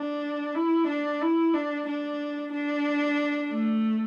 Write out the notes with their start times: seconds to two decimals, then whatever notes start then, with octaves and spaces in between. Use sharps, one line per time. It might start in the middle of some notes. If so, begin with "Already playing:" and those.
Already playing: D4
0.55 E4
0.87 D4
1.21 E4
1.54 D4
1.88 D4
2.52 D4
3.51 A3